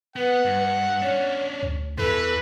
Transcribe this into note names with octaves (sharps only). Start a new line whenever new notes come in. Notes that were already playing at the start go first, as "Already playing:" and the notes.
B3 B4 F#5
G2
C#4 D4 C#5
D2
E2 E3 A4 B4